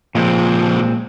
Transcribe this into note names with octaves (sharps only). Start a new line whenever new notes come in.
C#2 A#2 F3 G#3 C4